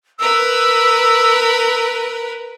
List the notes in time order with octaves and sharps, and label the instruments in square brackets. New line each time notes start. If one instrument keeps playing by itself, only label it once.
[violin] A#4 B4 [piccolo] E6